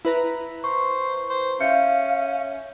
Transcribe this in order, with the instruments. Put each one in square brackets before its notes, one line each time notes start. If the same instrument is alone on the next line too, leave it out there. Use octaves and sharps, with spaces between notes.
[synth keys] E4 B4 A#5
[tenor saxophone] C5 [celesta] C#6
[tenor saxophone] C5
[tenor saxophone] C#4 [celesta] E5 G6 C#7 [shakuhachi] F5